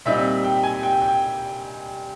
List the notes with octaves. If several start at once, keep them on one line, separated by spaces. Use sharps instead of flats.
A#2 G3 C4 D#4 E5
G5
G#5
G5
G5